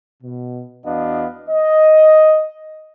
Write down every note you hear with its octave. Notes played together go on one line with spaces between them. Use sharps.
B2
E2 B3 D4 F#4 D#5 F5
D#5